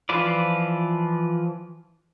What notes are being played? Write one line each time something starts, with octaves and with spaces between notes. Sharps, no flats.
E3 F3 F4 B4 D5